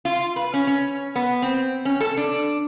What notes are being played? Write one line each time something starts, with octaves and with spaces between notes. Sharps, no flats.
F4
B4
C#4
C#4
B3
C4
C#4
A4
D4